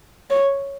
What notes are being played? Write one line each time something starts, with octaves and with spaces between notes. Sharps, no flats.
C#5